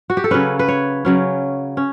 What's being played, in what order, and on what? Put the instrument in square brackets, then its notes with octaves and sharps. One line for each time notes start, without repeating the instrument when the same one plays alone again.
[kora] F#4
G4
A4
C#3 F#3 C#4 B4
B4
C#5
C#3 F#3 C#4
C#4